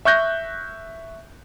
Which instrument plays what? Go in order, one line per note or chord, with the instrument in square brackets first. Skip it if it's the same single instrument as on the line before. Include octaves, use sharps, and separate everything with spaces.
[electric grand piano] E5 C#6 F#6 G6 A#6